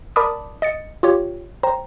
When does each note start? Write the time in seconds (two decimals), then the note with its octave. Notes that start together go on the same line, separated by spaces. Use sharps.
0.16 A#4 D5 A5 B5 D6 D#6
0.62 D#5 A6 C#7
1.03 F4 G4 C#5
1.63 C5 G5 A#5